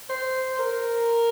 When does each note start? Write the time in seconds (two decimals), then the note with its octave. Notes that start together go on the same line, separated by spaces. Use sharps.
0.10 C5
0.59 A#4